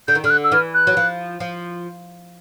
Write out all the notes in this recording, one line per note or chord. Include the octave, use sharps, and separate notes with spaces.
D3 G6
D#3
D3 F6
F#6
E6
E3 F6
F#6
F#3
F3
F3